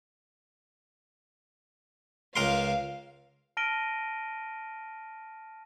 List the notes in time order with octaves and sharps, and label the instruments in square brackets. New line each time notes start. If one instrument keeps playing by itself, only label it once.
[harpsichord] C#2 A#4 C6 [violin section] F5
[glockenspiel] A5 F6 A#6 D7 D#7 G7